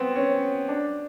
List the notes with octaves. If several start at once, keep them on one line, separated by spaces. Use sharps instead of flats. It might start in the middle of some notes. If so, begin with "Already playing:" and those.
Already playing: B3 C4
C#4
D4